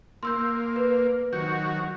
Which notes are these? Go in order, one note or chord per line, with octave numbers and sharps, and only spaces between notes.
A#3 C6 E6 G6
B4
D#3 F#3 F#4 G6 C#7